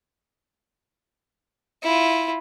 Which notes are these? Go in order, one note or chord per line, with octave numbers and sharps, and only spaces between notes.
E4 F4